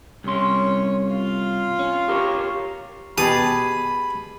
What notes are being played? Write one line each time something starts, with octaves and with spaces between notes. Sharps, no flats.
C2 C#4 C#5 C6
F4 F5
C#4
G4 A#4 C#5
B2 G4 G#4 A5 B5 D#6